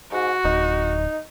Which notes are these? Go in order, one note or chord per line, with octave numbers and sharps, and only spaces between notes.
G#2 F#4
D1 D#4